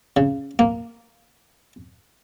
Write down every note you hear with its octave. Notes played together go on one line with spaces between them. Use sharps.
C#3
A#3